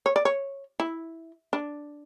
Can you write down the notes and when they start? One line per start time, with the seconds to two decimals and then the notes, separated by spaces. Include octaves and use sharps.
0.06 C#5
0.16 D5
0.25 C#5
0.80 E4
1.53 D4